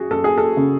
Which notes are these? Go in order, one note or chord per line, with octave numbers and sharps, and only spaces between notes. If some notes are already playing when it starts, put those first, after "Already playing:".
Already playing: F#2 F#4 G#4
F#2 A4
G#4
A4
C#3